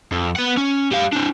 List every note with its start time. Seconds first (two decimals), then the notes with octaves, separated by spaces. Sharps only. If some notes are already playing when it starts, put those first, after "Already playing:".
0.12 F2
0.36 B3 F#5
0.57 C#4
0.91 G3 F5
1.12 C4 D4